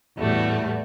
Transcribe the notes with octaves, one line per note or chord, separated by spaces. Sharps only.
E2 A2 G3 A3 F#4